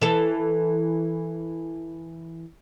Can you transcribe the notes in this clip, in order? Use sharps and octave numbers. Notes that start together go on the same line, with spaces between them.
E3 A4